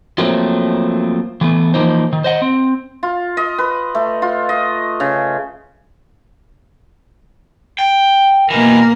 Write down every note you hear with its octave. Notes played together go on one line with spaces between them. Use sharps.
F3 F#3 A3 A#3 C4
E3 A3 B3
E3 F3 A#3 D#4 C5
D#3
C5 D#5 F#5
C4
F4
D#5
B4
A3
F4
D#5
C#3
G5
B2 E3 A#3 A#4